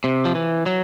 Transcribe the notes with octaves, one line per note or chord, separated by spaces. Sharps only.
C3
F3
E3
F#3